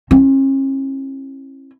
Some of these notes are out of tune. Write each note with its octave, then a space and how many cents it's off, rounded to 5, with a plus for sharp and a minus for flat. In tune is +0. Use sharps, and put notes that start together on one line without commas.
C#4 -45 E4 +0